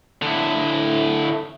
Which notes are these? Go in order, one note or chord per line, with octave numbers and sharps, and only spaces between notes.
D3 E4